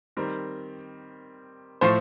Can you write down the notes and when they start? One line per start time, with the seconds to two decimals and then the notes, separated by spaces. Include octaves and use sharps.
0.17 D#3 G3 C4 A#4
1.81 A2 F3 A3 C5